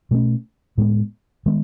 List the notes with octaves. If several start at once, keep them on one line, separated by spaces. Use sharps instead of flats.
B2 A3 C#4
A2 G#3 B3
D#3 G#3 B3